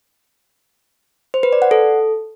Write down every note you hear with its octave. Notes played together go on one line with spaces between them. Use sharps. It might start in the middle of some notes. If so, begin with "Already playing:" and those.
C5
B4
D5
F#5
A4